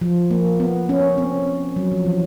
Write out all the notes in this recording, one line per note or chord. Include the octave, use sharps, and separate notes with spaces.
F3
A#3
B3
C#4
C4
F#3
F3
E3